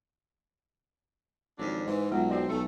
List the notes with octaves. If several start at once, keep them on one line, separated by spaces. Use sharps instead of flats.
G#1 F2 F#3 D4
G#2 E3
B1 F#3 G#3 F4 F#5
C4 F#4 D5 D#5
B1 A3